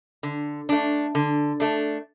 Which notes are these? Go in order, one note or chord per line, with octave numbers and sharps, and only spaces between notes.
D3
A3 D4
D3
A3 D4